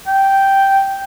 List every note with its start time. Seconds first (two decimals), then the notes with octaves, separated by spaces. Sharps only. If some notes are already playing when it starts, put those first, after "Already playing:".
0.07 G5